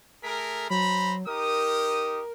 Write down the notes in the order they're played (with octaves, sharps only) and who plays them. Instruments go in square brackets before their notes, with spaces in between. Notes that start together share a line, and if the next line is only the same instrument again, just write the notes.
[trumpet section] A3 G#4 A#4 [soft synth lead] B6
[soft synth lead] F#3 [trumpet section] C5 A#5 B5
[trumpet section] D#4 G4 D#6 [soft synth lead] A#4